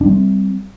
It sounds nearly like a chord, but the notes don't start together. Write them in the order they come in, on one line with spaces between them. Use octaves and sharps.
D4 G3 C4